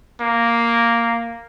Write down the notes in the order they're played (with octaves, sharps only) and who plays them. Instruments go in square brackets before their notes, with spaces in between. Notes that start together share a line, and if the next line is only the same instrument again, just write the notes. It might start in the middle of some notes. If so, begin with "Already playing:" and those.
[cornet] A#3